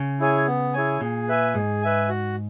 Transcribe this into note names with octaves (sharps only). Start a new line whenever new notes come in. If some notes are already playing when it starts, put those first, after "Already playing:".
Already playing: C#3
E4 G#4 C#5 G#5
B3
E4 G#4 C#5 G#5
A#2 G#4
B4 E5 G#5
G#2 G#4
B4 E5 G#5
F#4